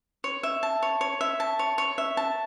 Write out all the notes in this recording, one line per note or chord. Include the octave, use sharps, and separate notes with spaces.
C#5
E5
A5
C#5
C#5
E5
A5
C#5
C#5
E5
A5